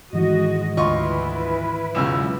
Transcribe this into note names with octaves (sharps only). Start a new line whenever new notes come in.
G#2 D#3 E3 G#3 F#4 D#5
D2 E4 F4 B4 D#5 C6 C#6
E1 C#2 F#2 C#3 E6 E7